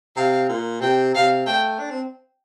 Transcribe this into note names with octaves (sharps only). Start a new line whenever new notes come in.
C3 F5
A#2
C3 G5
C3 F5
A3 G5
D4
C4